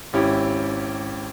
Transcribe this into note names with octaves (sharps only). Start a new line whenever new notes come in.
G#1 C#4 E4 G4